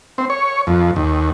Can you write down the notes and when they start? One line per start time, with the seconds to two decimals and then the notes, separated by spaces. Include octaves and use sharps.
0.18 C4
0.30 C#5
0.67 F2
0.96 D#2